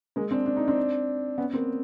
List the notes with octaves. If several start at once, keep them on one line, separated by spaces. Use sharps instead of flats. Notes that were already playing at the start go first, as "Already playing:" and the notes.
G#3 A#3
C4 D4
D4
D#4
C4 D4
B3 C#4
A#3 C4